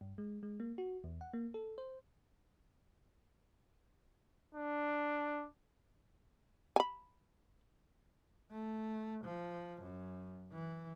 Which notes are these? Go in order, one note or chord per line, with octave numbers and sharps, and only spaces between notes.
G2
G#3
G#3
A#3
F#4
E2
F#5
A#3
A4
C5
D4
G#5 B5
A3
F3
F#2
E3